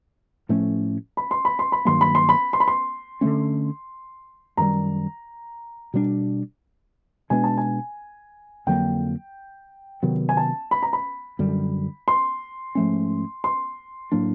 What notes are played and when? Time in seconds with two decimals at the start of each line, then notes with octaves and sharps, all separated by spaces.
0.49 A2 F3 A3 C#4
1.17 B5
1.31 C6
1.45 B5
1.59 C6
1.72 B5
1.85 G2 D#3 F#3 A#3 C6
2.01 B5
2.15 C6
2.29 B5
2.53 C6
2.60 B5
2.68 C6
3.21 D3 F#3 A3 C#4
4.57 F#2 D#3 G3 A#5
5.94 B2 G3 B3 D4
7.30 B2 G#3 B3 D4 G#5
7.44 A5
7.57 G#5
8.67 F2 D3 F#3 A#3 G5
10.03 C3 D#3 F#3 B3
10.29 G#5
10.37 A5
10.71 B5
10.83 A#5
10.93 B5
11.39 F#2 D3 G3
12.08 C6
12.75 G#2 F3 A3 C#4
13.44 C6
14.12 A2 F#3 A#3 D4